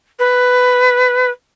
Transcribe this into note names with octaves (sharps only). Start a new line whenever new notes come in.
B4